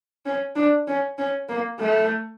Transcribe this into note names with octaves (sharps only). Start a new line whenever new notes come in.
C#4
D4
C#4
C#4
A#3
A3